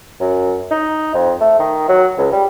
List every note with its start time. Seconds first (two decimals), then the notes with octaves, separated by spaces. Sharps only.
0.21 F#2
0.71 D#4
1.14 F2
1.41 A3
1.59 D#3
1.89 F#3
2.18 C#2
2.32 G3